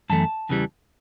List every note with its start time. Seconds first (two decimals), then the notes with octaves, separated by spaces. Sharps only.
0.10 F#2 E3 A3 A5
0.49 E2 C#3 E3 G3